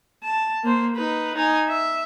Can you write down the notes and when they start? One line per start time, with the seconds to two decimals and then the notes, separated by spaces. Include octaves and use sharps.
0.23 A5
0.64 A#3 C5
0.96 D#4 B4
1.35 D#4 G#5
1.69 E5